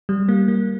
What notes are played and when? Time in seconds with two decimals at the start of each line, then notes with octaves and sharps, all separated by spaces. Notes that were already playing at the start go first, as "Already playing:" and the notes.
0.09 G3
0.29 A#3
0.48 A#3